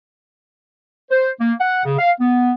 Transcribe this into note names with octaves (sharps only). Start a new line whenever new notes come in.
C5
A#3
F#5
C#3
F5
B3